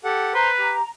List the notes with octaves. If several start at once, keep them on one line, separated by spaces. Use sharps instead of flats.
G4 A4 F#5
B4 C5 A#5 C6
G4